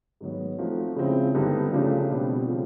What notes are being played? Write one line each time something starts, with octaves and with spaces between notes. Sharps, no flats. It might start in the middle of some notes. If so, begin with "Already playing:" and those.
G#2 D#3 F#3 B3
F3 A3 C4 D#4 F#4
C#3 F3 G#3 C4 E4
G2 D3 G3 B3 D#4
C#3 F3 A3 D4 G4
B2 G3 C4
C#3 F3 A3 C4 F4